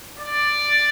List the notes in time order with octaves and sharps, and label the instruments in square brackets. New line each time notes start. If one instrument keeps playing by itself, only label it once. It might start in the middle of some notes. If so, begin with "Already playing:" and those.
[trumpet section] D5